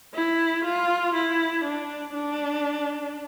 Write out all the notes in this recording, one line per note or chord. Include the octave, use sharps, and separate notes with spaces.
E4
F4
E4
D4
D4